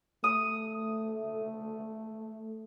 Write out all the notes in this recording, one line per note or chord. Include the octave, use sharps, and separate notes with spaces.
A3 D#6